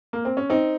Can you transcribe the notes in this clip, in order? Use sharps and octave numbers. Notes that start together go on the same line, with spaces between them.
A#3
C4
C#4
C4 D#4